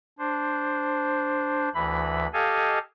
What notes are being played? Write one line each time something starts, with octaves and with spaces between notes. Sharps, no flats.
D4 C5
D2 E3 B5
G4 A4 D#5 F5 G#5